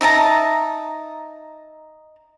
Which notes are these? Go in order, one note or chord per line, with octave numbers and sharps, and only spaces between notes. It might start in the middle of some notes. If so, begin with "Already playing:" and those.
D#4 E5 A5 A#5